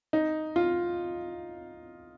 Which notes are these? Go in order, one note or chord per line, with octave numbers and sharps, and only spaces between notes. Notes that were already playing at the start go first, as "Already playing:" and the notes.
D#4
F4